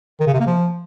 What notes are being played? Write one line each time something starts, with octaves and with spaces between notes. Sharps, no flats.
D#3
C#3
C3
A#3
F3